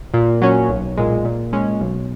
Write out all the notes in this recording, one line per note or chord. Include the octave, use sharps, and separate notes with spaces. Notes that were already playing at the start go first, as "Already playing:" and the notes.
A#2
F#3 C#4
B1
A#2 G#3
A#2
G#3 C#4
B1